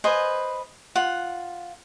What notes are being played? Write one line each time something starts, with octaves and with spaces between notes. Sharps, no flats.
B4 C5 D#5 G#5
F4 F#5